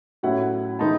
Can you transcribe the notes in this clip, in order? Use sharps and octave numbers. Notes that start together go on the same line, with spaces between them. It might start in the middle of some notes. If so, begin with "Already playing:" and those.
A2 F#3 C#4 E4 F#5
E3 G#3 D#4 A5